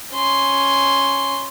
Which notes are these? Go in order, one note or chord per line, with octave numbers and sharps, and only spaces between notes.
C#4 C6